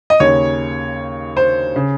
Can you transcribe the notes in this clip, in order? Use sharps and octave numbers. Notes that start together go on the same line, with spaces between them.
D#5
D#2 C#3 C#5
C5
C#3